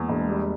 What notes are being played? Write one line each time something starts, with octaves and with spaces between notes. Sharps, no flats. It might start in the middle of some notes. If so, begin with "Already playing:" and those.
Already playing: E2 G#3 A#3
E1
G3